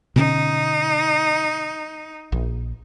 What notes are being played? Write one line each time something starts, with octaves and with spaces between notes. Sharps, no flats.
B2 D3 C#4 D#4
A#1